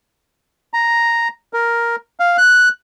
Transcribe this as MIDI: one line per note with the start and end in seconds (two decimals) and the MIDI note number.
0.73 1.28 82
1.53 1.96 70
2.20 2.37 77
2.38 2.69 90